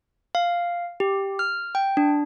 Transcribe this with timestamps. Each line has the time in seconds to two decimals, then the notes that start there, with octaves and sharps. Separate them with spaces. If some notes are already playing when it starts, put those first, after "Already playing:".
0.35 F5
1.00 G4
1.39 F6
1.75 G5
1.97 D4